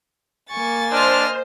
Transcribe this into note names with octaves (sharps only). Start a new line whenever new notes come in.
A#3 G#5 C#6 A6
D4 C5 D#5 F6